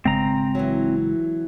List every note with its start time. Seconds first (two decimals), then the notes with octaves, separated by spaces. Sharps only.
0.05 G#1 C#3 G#3 C4 A#5
0.55 E3 F#3